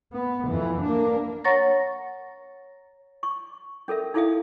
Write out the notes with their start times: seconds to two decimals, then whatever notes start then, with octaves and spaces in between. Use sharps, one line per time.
0.13 B3
0.48 F2 E3
0.82 A#3 D4
1.44 C#5 F#5 A#5 C#6 A6 A#6
3.23 C#6
3.88 C#4 A4 A#4 E5
4.14 D#4 E4 A4 E5 F5 D#6